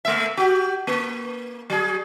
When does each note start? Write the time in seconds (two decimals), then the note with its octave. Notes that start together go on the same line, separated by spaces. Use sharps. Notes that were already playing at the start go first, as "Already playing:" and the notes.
0.05 A3 E5
0.37 F#4 G4
0.87 A#3
1.70 F#3 G#4